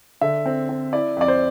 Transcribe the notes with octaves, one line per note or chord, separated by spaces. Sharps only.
D3 E5
C4
C4
E4 D5
F2 D5
C5